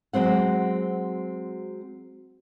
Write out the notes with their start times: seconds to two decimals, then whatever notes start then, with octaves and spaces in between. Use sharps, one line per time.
0.13 F#3 G#3 C4 F#5